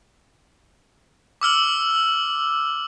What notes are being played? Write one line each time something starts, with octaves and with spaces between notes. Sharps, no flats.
D6 E6 F6 F#7